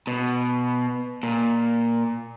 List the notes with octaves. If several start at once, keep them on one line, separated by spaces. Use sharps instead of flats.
B2
A#2